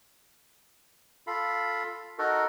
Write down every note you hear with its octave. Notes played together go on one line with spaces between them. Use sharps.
F4 A4 F5 B5
D#4 F#4 A4 A#4